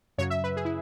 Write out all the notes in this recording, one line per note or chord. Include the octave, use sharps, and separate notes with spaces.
F#2 C#3 F#3 C#5
E5
B4
G#4
E4